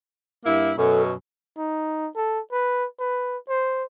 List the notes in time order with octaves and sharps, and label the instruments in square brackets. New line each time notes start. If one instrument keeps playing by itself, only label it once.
[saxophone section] G2 A#3 E4
[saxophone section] F#2 B2 [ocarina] A4
[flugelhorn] D#4
A4
B4
B4
C5